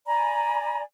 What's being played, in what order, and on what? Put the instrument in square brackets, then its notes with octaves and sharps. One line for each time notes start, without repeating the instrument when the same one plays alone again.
[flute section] D5 G#5 A#5 B5